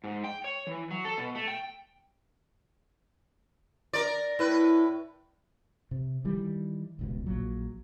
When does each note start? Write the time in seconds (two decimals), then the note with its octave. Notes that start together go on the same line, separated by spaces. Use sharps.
0.04 G#2
0.24 G5
0.44 C#5
0.67 E3
0.91 F#3
1.05 A4
1.18 B2
1.35 A3
1.48 G5
3.93 A#4 D5
4.39 A2 E4 B4
5.91 C3
6.24 D#3 E3 G3
6.99 D#1 C#2 B2
7.26 A#1 A#2 F#3